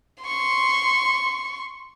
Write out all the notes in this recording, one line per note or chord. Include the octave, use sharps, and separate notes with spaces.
C6 C#6